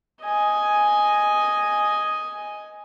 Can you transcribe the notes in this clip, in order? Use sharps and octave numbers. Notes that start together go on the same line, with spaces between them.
D#5 G#5